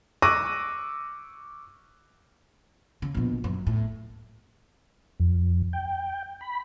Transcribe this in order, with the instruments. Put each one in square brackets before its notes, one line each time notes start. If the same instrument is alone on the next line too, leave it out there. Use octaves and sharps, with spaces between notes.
[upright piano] C#6 D6 E6 F#6 A#6 D#7
[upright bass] C#3
A#1 B2
F#2
A2
[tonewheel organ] F2
G5
B5